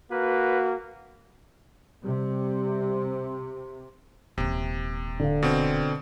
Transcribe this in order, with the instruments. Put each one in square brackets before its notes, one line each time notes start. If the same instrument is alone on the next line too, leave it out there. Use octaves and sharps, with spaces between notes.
[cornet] A#3 [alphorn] F#4 [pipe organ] B4
[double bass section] C3 [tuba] G3
[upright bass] D#1 E3 [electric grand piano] C3
[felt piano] D3 F5
[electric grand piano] B2 C4